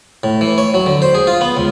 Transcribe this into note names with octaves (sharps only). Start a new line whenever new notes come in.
A2
E3
C#5
F#3
D3
C5
G#4
F4
B3
C#2